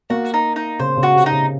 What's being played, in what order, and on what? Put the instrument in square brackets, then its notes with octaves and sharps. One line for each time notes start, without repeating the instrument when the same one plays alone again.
[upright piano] A#3 [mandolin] F#4
[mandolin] D#4
D#4
[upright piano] C#3 [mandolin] C5
[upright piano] C#3
[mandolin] F#4
[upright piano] C3
[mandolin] D#4
[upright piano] C#3